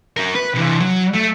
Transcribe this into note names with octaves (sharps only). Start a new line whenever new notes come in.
F#3 A#4
B4
C3 E3
F#3
A3